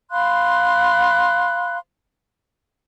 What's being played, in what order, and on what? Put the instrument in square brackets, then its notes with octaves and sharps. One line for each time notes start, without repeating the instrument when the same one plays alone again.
[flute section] F5 B5 C6 F#6